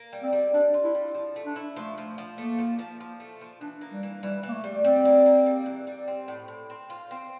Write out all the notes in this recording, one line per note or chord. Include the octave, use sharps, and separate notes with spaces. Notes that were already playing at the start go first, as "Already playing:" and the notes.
Already playing: A#3
G3
C4
G3
G3 D4
F4
E4
G3
F3
A3
D4
E4
F3 A3
F3
F3
A3 A#3
F3
F3
F3
A3
F3
E3 D4
A#3
G3
E3
E3 G3
E3
A#3
A3
G3
G3 C4
A#3
A#3
G3
E3
G3
C4
A2
A2
C4
F4
C4